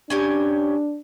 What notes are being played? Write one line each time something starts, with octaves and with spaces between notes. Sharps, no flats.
C#4 D4 G4 G#5